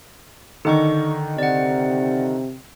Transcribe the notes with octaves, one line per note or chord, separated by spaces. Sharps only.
D3 D#3 D#4 D#5 C#6
C3 D5 F#5